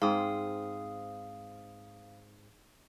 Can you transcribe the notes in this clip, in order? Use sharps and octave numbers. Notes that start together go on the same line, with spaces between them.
G#2 C4 F5 D#6